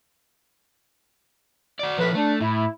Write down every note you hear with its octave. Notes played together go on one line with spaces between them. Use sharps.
F#4 D5
A2 F3 A#3 B4
A3 D4
A2 E4